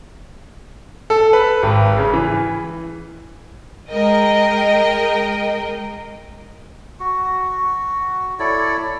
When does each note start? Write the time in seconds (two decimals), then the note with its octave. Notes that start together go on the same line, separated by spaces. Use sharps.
1.10 A4
1.33 B4
1.63 G#1
1.97 C#3
2.14 E3
3.90 G#3 A#4 D#5 G5
7.00 F#4
8.39 E4 A4 C#5 D5